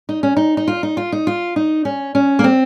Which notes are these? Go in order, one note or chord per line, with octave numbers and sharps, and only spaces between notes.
D#4
C#4
D#4
D#4
F4
D#4
F4
D#4
F4
D#4
C#4
C#4
A#3
C4